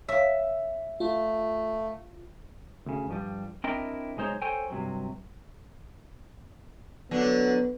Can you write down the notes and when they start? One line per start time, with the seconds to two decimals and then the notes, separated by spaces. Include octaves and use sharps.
0.08 C#5 E5 F5
1.00 A3 F4
2.86 D2 C#3
3.09 G2 F3 G3
3.64 C4 D4 E4 A#4 D#5 G5
4.17 B1 G#3 D#4 C5 C#5 A#5
4.42 A4 C5 C#5 G5 G#5
4.70 G2 C3 F#3
7.11 D3 F#3 B3 D4